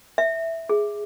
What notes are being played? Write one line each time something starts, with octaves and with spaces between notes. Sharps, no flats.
E5
G#4